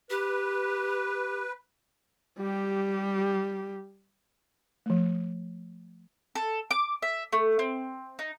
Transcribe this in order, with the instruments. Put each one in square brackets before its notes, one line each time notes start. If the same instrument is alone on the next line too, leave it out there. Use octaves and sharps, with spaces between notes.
[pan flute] G4 [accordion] B4
[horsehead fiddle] G3 G4
[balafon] F3 A3
[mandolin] A4
D6
E5
A3
C4
D#4